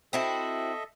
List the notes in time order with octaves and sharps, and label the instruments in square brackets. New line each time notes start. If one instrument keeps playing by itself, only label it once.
[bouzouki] C4 E4 F#4 [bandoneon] A4 D#5 E5